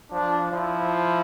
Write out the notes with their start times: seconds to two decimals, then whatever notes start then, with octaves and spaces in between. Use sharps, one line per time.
0.12 F3 D4
0.52 F3 E4